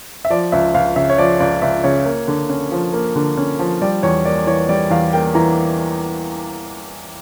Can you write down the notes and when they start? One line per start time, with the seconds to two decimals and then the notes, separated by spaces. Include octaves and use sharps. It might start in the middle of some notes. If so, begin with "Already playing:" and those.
0.25 E5
0.30 F3 D5
0.52 C#2 E5
0.74 C#2 F5
0.96 C#3 E5
1.10 C#5
1.18 F3 D5
1.40 C#2 D5
1.62 C#2 E5
1.84 C#3 C#5
2.06 A#3
2.28 D3
2.49 C#4
2.72 F3
2.93 A#3
3.16 D3
3.37 C#4
3.59 F3
3.82 G3 D5
4.03 E2 C#5
4.25 A#3 D5
4.47 E3 C#5
4.69 G3 D5
4.90 E2 F5
5.13 A#3 G5
5.35 E3 A#5